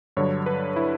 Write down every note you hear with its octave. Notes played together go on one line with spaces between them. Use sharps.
G2 D3 F#3 C#5
B4
E4